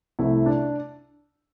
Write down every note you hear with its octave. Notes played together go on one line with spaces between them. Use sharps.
C2 C3 A3 E4
D4